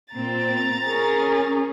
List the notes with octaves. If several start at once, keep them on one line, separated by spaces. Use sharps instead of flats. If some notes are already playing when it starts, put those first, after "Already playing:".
A#2 C4 A#5 A6
C#4 G#4 A#4